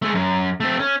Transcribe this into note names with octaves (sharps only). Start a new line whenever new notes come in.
G#3 A3
F#2
A3 C4
C#4